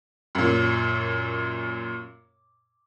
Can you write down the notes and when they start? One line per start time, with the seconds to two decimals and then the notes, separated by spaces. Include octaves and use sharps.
0.35 F#2 A#2